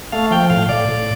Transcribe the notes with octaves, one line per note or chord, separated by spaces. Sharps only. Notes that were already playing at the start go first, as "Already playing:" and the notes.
A3 F5
F3 G5
A2 F5
A2 D5
A2